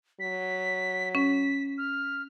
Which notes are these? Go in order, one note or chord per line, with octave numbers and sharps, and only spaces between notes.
F#3 B6
C#4 B6
F6